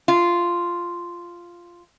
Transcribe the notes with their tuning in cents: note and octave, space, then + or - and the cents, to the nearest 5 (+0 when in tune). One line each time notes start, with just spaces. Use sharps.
F4 -5